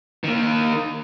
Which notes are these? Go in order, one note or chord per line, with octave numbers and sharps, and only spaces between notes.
D#3 A#3